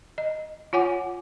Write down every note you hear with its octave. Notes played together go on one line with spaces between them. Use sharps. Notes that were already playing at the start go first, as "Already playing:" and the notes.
D#5
F4 C#5 F#5 G#5 D6